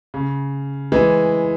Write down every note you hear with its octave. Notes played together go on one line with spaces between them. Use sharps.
C#3
E3 G#3